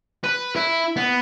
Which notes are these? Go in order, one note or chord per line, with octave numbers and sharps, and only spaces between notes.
B4
E4
B3